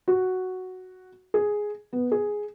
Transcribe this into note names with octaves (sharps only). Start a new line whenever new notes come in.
F#4
G#4
B3
G#4